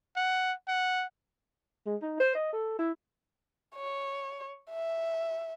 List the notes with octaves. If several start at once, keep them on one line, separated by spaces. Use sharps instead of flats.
F#5
F#5
G#3
D#4
C5
D#5
A4
E4
C#5
E5